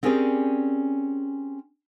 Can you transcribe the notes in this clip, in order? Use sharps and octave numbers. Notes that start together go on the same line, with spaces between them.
C4 C#4 G4 G#4 A#4 D5